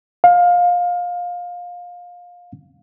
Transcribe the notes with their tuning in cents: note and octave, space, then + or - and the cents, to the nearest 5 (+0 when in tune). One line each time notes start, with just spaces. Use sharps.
F5 +20